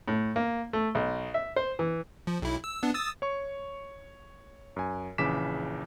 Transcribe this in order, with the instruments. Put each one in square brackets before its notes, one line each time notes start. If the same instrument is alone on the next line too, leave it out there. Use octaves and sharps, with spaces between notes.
[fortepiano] A2
A#3
A3
B1
E5
C5
E3
[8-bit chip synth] F3
B1 E4
E6
B3 D4
D#6 E6 A6
[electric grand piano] C#5 C#6
F#2 G#5
A#1 C#3 E3 D6 B6 E7